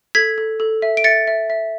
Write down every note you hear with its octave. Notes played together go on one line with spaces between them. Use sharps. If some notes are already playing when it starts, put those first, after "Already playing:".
A4 G#6 B6
A4
A4
E5
D7
E5 A6 C#7
E5
E5